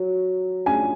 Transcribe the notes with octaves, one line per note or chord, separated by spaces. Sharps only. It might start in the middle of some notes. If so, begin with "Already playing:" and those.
Already playing: F#3
G#5